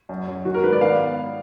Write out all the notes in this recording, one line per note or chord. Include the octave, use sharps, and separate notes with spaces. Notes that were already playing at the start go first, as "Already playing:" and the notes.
F#2
F#2
D#3 F#4
A#4
G#2 B4
D5
B3 F5